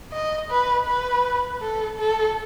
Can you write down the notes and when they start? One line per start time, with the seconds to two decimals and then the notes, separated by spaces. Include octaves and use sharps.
0.13 D#5
0.50 B4
0.86 B4
1.61 A4
1.98 A4